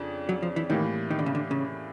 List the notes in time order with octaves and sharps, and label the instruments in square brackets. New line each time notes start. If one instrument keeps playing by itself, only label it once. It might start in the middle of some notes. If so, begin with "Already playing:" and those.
Already playing: [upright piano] F2 C#3 D4
[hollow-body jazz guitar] F#3
F3
E3
[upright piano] A2 E3 G3 A#3 [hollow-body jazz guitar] D#3
[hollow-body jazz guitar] D#3
D3
C#3
D3
C#3